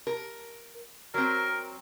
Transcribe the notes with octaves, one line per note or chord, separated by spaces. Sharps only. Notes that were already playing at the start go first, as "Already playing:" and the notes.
A#4
F#3 C4 A#4